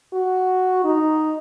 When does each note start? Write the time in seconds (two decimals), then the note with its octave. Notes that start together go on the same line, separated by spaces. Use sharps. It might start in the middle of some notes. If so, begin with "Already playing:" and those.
0.13 F#4
0.84 D#4